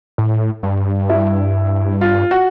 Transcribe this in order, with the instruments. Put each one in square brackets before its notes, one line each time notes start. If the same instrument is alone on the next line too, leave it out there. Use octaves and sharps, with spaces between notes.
[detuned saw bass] A2
G2
[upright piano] E4
F4
F#4